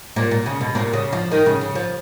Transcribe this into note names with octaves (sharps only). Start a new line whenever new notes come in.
A#2
A#2
C#3
B2
A#2
C#3
F3
D#3
C#3
C#3
F3